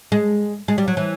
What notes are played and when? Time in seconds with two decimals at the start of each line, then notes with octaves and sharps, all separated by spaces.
0.12 G#3
0.68 G#3
0.78 G3
0.88 F#3
0.97 E3